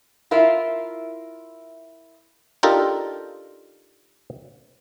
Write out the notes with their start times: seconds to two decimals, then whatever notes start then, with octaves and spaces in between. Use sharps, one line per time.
0.31 E4 F4 A#4 E5
2.63 D4 D#4 F4 G4 A4 A#4